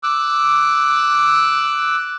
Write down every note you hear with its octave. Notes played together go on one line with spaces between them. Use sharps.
D6 E6 F#6